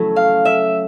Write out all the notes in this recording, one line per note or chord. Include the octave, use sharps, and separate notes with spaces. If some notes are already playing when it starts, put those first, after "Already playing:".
Already playing: F#3 A3 C#4 E4
F5
E5